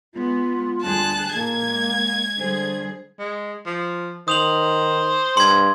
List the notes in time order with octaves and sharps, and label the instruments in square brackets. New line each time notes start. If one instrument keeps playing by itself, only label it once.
[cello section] G#3 B3 [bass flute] F4
[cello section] D2 G3 G#4 [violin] A5 F#6
[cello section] A#2 D#3 [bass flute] A#3 [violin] G#6
[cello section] G#3
[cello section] D3 G3 G#4 [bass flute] C5
[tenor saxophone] G#3
F3
[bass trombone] D#3 [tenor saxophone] C5 [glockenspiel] D#6 F7 F#7
[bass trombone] G2 [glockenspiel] C6 G#6